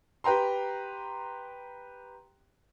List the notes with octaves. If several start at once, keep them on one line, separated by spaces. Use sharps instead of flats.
G4 B4 G5 A#5 C6